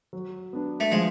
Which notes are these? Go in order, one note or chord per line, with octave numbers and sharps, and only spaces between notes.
F#3
B3 D4
A3
F3 G#3